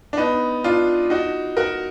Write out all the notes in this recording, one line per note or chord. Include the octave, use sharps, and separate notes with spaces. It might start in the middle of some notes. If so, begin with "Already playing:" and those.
D4
B3 D#4
D4 F4
D#4 F#4
F#4 A#4